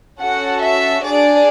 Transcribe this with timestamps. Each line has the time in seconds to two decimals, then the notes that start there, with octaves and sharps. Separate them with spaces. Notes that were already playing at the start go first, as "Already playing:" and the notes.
0.20 C#4 F#4 A4 F#5
0.61 E5
1.03 D4 G#4 D5